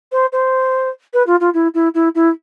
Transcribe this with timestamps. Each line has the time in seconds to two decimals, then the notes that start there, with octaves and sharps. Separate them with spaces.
0.12 C5
0.32 C5
1.13 B4
1.26 F4
1.40 F4
1.53 E4
1.74 E4
1.94 E4
2.15 E4